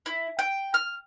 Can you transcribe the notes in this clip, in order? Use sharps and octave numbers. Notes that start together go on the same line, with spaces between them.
E4
G5
F6